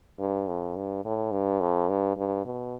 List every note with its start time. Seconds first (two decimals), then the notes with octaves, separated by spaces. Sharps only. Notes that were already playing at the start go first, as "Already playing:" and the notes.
0.19 G2
0.48 F2
0.76 G2
1.05 A2
1.32 G2
1.61 F2
1.89 G2
2.17 G2
2.45 B2